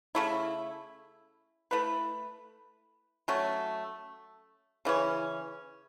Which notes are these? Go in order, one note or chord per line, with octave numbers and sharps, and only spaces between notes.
C#3 A3 E4
A3 E4 B4
F#3 A3 C#4
C#3 E3 C#4